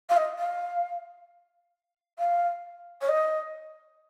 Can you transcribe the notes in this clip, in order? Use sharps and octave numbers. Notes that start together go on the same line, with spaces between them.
F5
D#5
F5
F5
C#5
D#5